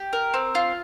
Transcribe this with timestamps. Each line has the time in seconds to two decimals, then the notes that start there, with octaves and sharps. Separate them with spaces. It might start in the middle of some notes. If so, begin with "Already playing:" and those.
Already playing: G4
0.13 A#4
0.34 C4
0.55 F4